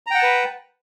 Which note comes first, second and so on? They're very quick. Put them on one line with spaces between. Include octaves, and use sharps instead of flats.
A#5 G5 F#5 A5 B4